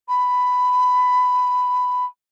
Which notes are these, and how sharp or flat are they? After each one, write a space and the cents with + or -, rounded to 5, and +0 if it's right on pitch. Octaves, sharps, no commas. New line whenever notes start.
B5 +10